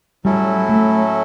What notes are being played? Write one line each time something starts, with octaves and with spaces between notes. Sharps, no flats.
A2 F#3 G3 C#4 E4 A4
A3